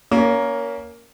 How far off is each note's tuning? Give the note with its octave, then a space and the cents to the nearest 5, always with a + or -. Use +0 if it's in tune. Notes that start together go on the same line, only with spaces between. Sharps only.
A#3 +10 C#4 +25 A#4 +0